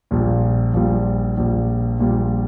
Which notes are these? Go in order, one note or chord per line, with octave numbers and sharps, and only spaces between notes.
A#1 A#2 G3
A#1 A#2 G3
A#1 A#2 G3
A#1 A#2 G3